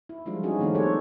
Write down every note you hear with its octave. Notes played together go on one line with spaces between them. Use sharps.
E4
E3 F3 G3 G#3 D4 F4
C#4 D#4 F#4 G#4
D#3 F3 A3 C4 D4
F3 A#3 G4 A4 C5 C#5